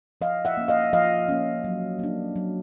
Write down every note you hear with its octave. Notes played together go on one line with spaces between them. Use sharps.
F3 D#5 F5
E5 F#5
A#3 C#4
D#5 F5
F3 D#5 F5
A#3 C#4
F#3
A#3 D4
F#3